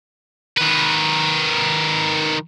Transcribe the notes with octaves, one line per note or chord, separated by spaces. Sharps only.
D#3 B4